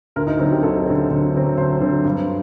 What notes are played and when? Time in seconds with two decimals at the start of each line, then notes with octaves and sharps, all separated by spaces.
0.16 D2 A#4
0.27 D#4
0.39 D3 F#3 C4 D#4
0.52 G4
0.63 D2 A4
0.86 D3 F#3 C4
1.10 D2
1.35 D3 F#3 C4
1.57 D2 C5
1.81 D3 F#3 C4
2.04 G2